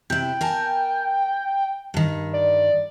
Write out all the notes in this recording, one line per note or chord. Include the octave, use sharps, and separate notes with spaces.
C3 E4 G5
A#4 G#5 A5
G2 D#3
D5